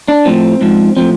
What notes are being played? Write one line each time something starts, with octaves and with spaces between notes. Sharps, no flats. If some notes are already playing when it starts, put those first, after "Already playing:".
D4
A2 F3 C4
G#2 F3
A2 F3 C4